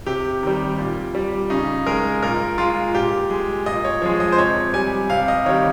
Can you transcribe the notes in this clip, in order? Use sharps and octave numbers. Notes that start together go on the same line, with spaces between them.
C3 G4
D#3 G3
A#2
G3
C#3 D#4
G#3 A#4
A#2 A#4
G#3 F4
A#2 G4
G#3
A#2 D#5
C#5
F3 G#3 C#5
D#5
C5
C3 C#5
G3 G#5
C3 F5
D#5
D#3 G3 C#5